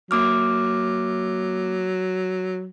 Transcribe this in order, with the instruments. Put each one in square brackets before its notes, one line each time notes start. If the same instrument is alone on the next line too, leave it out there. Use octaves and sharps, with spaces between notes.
[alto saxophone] F#3 [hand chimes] A#3 D6 F6